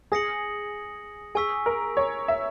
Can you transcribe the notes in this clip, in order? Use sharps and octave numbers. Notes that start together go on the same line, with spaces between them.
G#4 D#6 A#6 C#7 F#7
G#4 G#5 C#6 E6 B6
A#4
C#5
E5